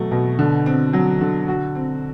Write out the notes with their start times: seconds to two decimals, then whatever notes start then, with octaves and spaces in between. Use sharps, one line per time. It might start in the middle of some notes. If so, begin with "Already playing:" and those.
Already playing: B2 F#3 A3
0.11 B2
0.39 D3
0.66 C4
0.93 F#3
1.21 D3
1.48 F#4
1.75 C4